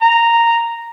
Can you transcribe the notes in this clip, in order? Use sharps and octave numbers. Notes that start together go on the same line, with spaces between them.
A#5